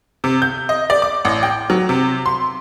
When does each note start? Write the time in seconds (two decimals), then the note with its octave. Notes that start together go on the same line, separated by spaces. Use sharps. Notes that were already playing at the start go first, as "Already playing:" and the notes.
0.24 C3
0.42 G6
0.69 D#5
0.90 D5
1.02 D6
1.25 A1
1.43 G5
1.70 F#3
1.89 C3
2.26 C6